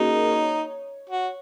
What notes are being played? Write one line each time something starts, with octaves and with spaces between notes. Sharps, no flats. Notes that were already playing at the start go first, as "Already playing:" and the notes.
Already playing: A#3 C#4 D#4 F#4 G#4 A#4
C#5
F#4